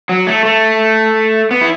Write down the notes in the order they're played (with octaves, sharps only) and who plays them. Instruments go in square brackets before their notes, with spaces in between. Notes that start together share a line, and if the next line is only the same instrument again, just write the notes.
[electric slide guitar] F#3
A3
A3
B3
E4